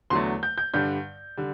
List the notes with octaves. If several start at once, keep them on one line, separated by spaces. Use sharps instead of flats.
E2 D3 F#3 A3 C6
G6
G6
G2 D3 G3 G6
D3 G3